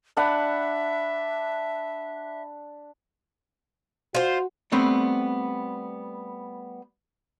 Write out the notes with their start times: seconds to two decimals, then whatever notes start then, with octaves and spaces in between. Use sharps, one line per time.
0.17 D4 E5 F#5 B5
4.15 F4 F#4 C5
4.72 G3 A3 B3 C4